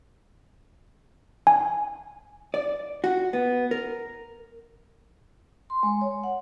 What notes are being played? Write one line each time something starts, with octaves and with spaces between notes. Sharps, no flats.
G#5
D5
F#4
B3
A#4
C6
G#3
C#5
F#5